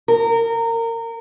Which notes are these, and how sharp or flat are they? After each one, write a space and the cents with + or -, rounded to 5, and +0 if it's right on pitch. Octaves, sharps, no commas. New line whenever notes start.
A#4 -25